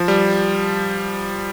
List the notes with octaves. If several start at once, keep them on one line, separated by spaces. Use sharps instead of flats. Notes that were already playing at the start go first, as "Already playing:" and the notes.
Already playing: F3
G3